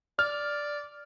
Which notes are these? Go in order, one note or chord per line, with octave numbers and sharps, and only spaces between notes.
D5 F6